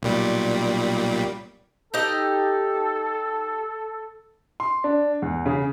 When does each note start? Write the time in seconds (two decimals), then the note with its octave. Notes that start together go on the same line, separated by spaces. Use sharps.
0.02 B1 A#2 G3
1.94 D#4 G4 A4 D#5
4.60 C6
4.84 D4
5.22 E2
5.46 C#3